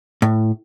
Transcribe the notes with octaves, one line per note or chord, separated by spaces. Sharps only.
A2